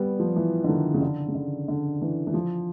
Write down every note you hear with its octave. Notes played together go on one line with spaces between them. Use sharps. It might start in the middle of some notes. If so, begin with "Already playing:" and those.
Already playing: G3 B3
F3
E3
D3
D#3
C#3
D3
C#3
D3
D3
E3
E3
F3